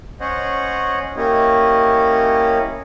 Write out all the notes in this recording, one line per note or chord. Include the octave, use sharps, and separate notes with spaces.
C#4 C5 C#5 D#5 F#5
A#3 C#4 E4 G4 C#5 D#5